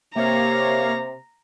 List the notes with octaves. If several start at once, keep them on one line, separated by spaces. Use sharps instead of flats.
C3 A#3 C#5 F5 A#5